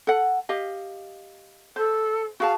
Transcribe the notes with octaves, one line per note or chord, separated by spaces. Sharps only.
A4 F#5
G4 D#5 F5
A4 C5
F#4 G#4 F5 A5